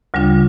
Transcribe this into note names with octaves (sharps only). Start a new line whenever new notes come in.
D2 C#3 G3 D4 F4